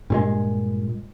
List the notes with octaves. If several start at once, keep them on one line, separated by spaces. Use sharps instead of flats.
G2 A#2 G#3